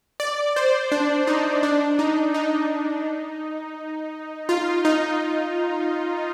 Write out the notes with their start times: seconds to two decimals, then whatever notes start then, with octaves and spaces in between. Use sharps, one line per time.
0.20 D5
0.56 C5
0.92 D4
1.27 D#4
1.63 D4
1.99 D#4
2.34 D#4
4.49 F4
4.85 D#4